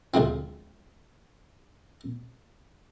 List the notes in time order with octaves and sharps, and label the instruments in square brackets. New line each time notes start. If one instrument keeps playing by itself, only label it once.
[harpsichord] D2 G#2 C3 F3 C4